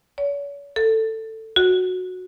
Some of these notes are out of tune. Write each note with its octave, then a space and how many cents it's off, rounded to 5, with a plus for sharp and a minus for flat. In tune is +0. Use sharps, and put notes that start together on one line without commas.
C#5 +40
A4 +15
F#4 -10